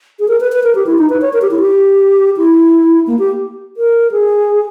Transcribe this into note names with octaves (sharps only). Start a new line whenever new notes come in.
G#4
A#4
B4
B4
A#4
G4
E4
D#4
B4
C#5
A#4
G4
E4
G4
E4
A#3
G4
A#4
G#4